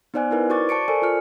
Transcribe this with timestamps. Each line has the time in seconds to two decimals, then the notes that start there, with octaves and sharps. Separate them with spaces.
0.14 B3 D#4 C5 D5 G#5 F#6
0.31 D#4 E4 A#4 B4
0.50 F#4 C5 D5 C#6 D6 A6
0.69 C5 A5 C#6 C#7 D7
0.88 A4 A#4 C5 D5 G#5
1.02 F4 C5 F6 C#7